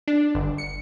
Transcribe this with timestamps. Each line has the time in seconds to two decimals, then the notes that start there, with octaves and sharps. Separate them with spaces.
0.08 D4
0.35 G1
0.58 C#7